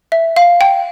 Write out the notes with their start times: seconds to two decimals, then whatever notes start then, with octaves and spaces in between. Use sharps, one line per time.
0.12 E5
0.36 F5
0.61 G5